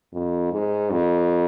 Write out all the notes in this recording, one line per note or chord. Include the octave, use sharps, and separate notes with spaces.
F2
G#2
F2